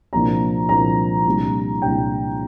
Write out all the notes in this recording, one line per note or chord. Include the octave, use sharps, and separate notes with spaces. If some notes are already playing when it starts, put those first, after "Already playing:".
C2 A#2 F3 A#3 D4 A#5
C2 A#2 F3 A#3 D4 A#5
C2 A#2 G3 D4
C2 A#2 G3 D4 G5